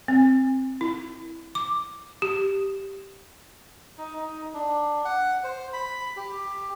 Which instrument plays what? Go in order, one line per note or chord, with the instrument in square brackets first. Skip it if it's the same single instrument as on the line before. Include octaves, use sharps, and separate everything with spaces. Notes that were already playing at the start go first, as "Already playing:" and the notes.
[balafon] C4
E4
D6
G4
[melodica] D#4
D#4
D4
F#5
C5
B5
G4